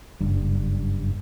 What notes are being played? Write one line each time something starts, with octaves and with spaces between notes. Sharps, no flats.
F#1 G2